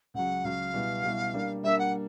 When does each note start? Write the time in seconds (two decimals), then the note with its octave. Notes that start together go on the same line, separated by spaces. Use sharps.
0.14 C#2 C#3 F#3 F#5
0.44 C#2 C#3 F#3 F5
0.74 B2 G3 B3 E4
1.04 B2 G3 B3 E4
1.34 G3 A#3 D4
1.63 G3 A#3 D4 E5
1.79 F#5